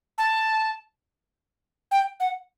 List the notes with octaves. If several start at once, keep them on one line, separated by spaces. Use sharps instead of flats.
A5
G5
F#5